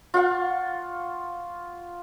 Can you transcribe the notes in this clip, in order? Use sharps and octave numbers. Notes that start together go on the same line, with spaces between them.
F4 F5 F#5 C#6